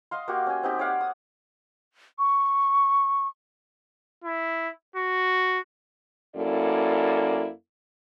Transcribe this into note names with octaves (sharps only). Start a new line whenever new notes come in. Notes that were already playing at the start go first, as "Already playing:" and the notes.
D#5 F5 C6
A#3 F#4 G4
C#4 G#5
C4 D#4 G4
C#5 D5 F5 F#5
D#6
C#6
E4
F#4
F#2 A#3 E4 A4 D5